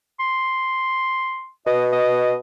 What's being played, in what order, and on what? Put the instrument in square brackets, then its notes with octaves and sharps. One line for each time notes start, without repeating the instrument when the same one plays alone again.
[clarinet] C6
[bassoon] B2 [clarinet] D#5
[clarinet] D#5